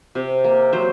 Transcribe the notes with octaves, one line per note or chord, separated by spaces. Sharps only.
C3
A#3
F#3 C5